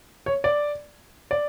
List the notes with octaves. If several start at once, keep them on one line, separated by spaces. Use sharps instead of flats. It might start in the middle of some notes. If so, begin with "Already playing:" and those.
C#5
D5
D5